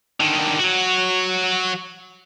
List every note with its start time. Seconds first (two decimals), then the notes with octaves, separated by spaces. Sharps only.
0.20 D3 D#3
0.60 F#3 F#4